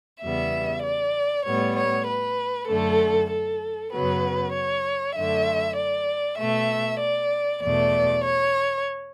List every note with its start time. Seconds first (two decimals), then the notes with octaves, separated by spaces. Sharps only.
0.21 E2 C#3 G3 B3 E5
0.83 D5
1.45 A2 G3 B3 C#5
1.76 C#5
2.07 B4
2.68 F#2 D3 A3 A4
3.30 A4
3.92 F#2 C#3 F#3 B3 B4
4.54 C#5
5.15 F#2 D3 A3 E5
5.77 D5
6.38 B2 A3 E5
7.00 D5
7.62 E2 B2 A3 D5
8.24 C#5